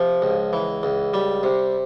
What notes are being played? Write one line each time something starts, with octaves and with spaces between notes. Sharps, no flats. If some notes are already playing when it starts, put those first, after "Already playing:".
Already playing: C3 F3
C#2
E3
C#2
G3
C3